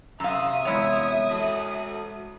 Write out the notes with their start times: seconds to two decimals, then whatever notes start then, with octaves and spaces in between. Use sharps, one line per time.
0.20 F#2 C3 E5 F5 A#5 D#6
0.65 E2 C3 F#3 G#3 E4 C#5
1.29 F#4 A4